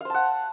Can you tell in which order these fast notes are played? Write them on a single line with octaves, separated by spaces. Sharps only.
F5 C5 A5 F#5